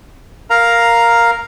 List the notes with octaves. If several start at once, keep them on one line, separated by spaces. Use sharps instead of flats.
A#4 F5 A#5